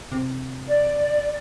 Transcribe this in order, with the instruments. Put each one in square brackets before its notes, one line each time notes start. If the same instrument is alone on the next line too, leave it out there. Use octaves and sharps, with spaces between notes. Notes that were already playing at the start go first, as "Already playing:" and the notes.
[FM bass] C3
[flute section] D5